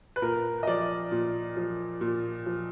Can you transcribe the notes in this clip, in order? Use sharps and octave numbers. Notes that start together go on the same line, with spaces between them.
B4
A#2 A#4
D#5
F3 D5
A#2
F3
A#2
F3